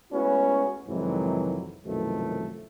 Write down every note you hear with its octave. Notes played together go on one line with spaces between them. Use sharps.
G#3 A3 B3 C#4 E4 F#4
F2 G#2 C3 D#3 E3 F#3
C2 F#2 B2 D#3 F3 A3